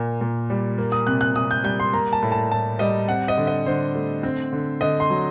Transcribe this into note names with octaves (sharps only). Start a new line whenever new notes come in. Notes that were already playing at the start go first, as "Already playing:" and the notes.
Already playing: A#2 A#3
A#2
G3
A#3
D#6
C3 F#6
F#6
C3 D#6
G6
G3 G6
C6
A#3 A#5
A5
A2
A5
A2 A5
G3 D#5
C4 F#5
D#5
D3
D#5
D3 C5
A3
C4
D3
D3 D#5
C6
F#3